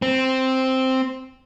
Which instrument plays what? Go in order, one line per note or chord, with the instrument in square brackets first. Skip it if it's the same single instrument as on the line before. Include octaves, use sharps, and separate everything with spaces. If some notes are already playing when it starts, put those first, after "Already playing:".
[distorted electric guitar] C4